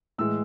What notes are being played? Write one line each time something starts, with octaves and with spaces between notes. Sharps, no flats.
A2 E3 G#3 E6